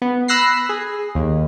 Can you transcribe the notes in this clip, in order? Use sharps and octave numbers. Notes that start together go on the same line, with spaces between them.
B3
B5 E6 F#6 A#6 C7
G#4
D#2